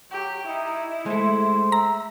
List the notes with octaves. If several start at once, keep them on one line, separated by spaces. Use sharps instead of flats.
F#3 G4
D#4 E4
G#3 A3 C5
E5 A#5